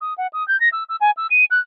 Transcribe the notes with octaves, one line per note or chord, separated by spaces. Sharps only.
D#6
F#5
D#6
G6
A#6
E6
E6
G#5
E6
D#7
F#6